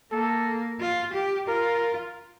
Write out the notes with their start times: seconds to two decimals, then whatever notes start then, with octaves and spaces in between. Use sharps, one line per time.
0.12 A#3 A4
0.80 F4
1.14 G4
1.48 F4 A#4